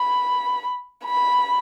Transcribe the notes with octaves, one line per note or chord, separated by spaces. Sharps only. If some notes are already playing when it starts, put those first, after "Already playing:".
Already playing: B5
B5